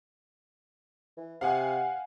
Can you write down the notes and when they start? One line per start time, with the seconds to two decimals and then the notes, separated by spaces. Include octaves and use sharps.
1.17 E3
1.41 C3 F5 F#5 G#5